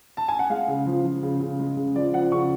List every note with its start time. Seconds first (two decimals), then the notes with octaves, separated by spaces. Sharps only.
0.17 A5
0.28 G#5
0.39 F#5
0.50 G#3 F5
0.68 C#3
0.86 F3
1.05 F3
1.23 C#3
1.41 C#3
1.60 G#3
1.77 C#3
1.96 F3 D5
2.14 F3 F#5
2.32 C#3 C#6